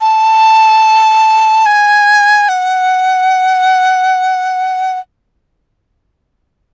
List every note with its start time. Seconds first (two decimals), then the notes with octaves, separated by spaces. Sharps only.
0.01 A5
1.66 G#5
2.49 F#5